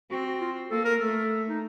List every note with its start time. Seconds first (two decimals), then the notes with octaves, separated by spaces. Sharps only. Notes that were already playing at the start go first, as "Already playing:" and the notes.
0.11 C4 F#4
0.26 F#4
0.41 F4
0.71 A#3 A4
0.85 A#4
1.00 A3 A4
1.49 D#4